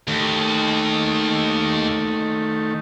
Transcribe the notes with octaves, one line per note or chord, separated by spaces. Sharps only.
D#2 D#3 A3